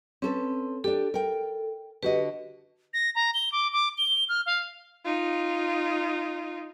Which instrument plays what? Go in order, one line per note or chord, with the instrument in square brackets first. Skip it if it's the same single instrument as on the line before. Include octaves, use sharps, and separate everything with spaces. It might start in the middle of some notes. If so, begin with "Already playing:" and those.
[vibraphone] C4 [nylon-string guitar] C#4 A4 B4
[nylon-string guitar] D4 G4 [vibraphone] A4
[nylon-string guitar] A#4 G5
[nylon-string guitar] D3 F#4 D#5 [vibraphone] G4 B4
[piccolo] A#6
A#5
G7
D6
D6
G7
F6
F5
[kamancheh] D#4 F4